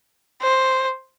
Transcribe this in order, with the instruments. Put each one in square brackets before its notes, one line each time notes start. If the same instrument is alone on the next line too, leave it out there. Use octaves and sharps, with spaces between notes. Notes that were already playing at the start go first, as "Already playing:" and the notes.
[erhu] C5